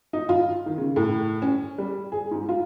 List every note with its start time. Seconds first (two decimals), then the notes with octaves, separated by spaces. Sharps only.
0.13 D#4
0.29 F4
0.66 D#3
0.78 C#3
0.96 A2
1.42 C#4
1.78 G3
2.12 G#4
2.31 G#2
2.49 F4